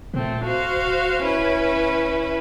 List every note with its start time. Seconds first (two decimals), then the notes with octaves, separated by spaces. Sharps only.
0.14 A#2 A3 C4
0.43 F#4 C5 F5
0.77 D1
1.23 C#4 E4 B4